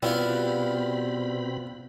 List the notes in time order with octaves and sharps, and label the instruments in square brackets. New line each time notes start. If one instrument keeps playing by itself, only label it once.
[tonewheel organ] B2 C4 B5 [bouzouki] G3 [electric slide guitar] B3 [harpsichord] E4 F4 F5